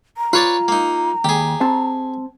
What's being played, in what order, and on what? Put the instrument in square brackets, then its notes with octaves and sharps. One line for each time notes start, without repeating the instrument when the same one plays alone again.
[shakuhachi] A#5
[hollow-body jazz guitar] F4 [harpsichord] B4 C#5 D5
[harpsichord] A#3 D#4
[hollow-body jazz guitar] D#2 [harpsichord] G4 G#4
[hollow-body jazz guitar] C4 A5